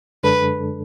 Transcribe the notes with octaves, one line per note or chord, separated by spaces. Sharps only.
F#2 D3 G#3 D4 A4 B4